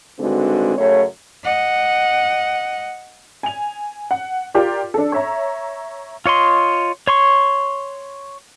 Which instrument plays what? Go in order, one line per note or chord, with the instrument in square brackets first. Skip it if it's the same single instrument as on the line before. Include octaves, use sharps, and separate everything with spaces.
[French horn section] G2 D3 D#3 G#3 C4 F#4
F#2 C#3 A3 C#5
[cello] D#5 F#5
[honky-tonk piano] G#5 F7
F#5
F4 G4 A#4 D5
D4 A4
C#5 E5 A#5
[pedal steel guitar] F4 C#5 D#5 C6
C#5 C6 C#6